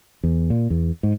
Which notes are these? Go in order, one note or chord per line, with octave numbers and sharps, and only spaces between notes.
E2
A#2
E2
G#2